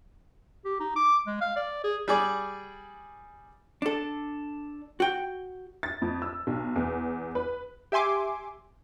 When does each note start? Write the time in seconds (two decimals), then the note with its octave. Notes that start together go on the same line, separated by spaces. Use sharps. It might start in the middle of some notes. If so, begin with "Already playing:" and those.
0.65 G4
0.80 D#4
0.96 D6
1.27 G#3
1.41 F5
1.56 D5
1.84 G#4
2.08 G3 G#4 D5
3.82 D4 A4
5.00 F#4 G5
5.83 A6
6.02 F2
6.22 E6
6.47 B1
6.76 E2
7.35 B4
7.92 G4 E5 G#5 C6 D6